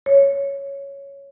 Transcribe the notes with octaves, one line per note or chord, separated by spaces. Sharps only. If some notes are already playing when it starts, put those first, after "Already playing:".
C#5